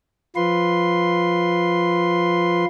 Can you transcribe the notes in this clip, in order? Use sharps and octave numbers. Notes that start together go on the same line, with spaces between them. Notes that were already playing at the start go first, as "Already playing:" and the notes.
F3 F4 B4 C6